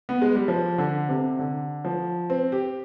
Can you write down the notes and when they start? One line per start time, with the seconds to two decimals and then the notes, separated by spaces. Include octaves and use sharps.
0.09 B3
0.22 G#3
0.35 G3
0.48 F3
0.78 D3
1.09 C3
1.39 D3
1.85 F3
2.30 C4
2.52 G4